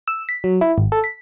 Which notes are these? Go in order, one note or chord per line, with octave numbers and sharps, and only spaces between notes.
E6
B6
F#3
E4
G#1
A4
B6